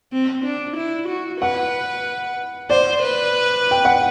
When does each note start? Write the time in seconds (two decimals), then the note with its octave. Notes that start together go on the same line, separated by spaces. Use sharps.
0.12 C4
0.45 D4
0.77 E4
1.09 F#4
1.41 B4 F#5
2.70 C5 D5
3.03 B4
3.71 G5
3.85 F#5